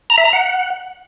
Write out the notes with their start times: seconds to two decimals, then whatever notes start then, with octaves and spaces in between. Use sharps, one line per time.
0.10 A#5
0.18 E5
0.25 A#5
0.33 F#5